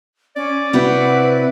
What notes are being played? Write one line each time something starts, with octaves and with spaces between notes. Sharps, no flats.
C#4 D5
C3 C4 E4 F#4 B4